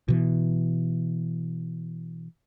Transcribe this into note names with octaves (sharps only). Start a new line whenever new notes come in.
B2 E3